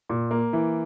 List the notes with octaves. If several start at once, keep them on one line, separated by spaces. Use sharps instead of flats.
A#2
A#3
E3